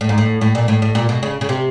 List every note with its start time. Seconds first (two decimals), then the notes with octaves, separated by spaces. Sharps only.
0.01 A2
0.09 G#2
0.18 A2
0.41 A2
0.55 A#2
0.68 A2
0.82 A2
0.95 A#2
1.09 B2
1.23 C#3
1.41 C#3
1.49 C3